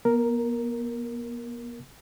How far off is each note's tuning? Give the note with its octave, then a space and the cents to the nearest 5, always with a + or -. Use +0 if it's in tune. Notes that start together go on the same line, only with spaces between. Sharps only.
B3 -45 A#4 +0